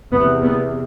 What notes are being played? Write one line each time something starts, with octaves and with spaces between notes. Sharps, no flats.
E2 C3 B3
B3